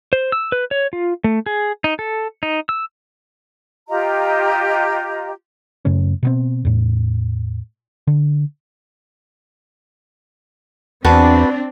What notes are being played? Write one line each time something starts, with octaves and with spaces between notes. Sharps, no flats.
C5
E6
B4
C#5
F4
A3
G#4
D#4
A4
D#4
E6
F4 G4 D#5 A#5
F#2 C#3 A3 C#4
B2 B3 C4
E2 A2
D3
E2 C4 D4 F#4 B4 A5